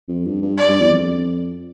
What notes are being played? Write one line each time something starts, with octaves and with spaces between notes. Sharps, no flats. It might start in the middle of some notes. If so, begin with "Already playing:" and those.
F2
G2
G2
D5
G2
E2
F2